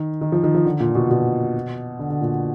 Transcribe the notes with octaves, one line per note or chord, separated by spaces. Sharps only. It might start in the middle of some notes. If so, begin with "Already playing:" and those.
Already playing: D#3
D#3
F3
D#3
F3
D3
A#2
B2
B2
D3
D3
A#2